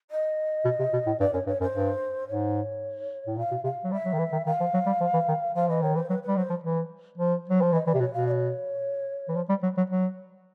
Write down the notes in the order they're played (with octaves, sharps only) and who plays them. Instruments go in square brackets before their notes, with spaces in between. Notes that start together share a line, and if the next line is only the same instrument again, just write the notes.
[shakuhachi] D#5
[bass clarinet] B2
C3
B2
A2
[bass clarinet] G2 [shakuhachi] D5
[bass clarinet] F#2 [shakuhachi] C#5
[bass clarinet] G2 [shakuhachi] C#5
[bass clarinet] F#2 [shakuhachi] C5
[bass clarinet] G2
[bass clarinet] G#2 [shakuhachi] C#5
[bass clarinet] A2
[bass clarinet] A#2 [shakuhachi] F5
[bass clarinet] B2
[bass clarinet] C3 [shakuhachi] F5
[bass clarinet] F#3
[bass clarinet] G3 [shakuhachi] E5
[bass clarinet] F#3
D#3
E3
D#3
[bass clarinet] D#3 [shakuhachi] F5
[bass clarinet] F3
F#3
G3
F3
E3
D#3
[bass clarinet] F3 [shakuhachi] F5
[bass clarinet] E3 [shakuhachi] D#5
[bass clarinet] D#3 [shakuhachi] C#5
[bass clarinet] E3 [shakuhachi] C5
[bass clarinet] F#3 [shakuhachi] B4
[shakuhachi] B4
[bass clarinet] G3
[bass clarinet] F#3 [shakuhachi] C5
[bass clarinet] F3
E3
F3
F#3
F3
[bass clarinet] E3 [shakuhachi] D#5
[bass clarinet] E3 [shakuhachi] D5
[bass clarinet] C3
[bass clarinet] B2 [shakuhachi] C#5
[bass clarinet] B2 [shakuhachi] F5
[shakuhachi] D5
C#5
[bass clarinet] E3
F3
G3
F#3
F#3
F#3